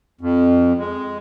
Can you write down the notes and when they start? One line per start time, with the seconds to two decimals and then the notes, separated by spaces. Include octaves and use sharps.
0.21 F2
0.79 G#3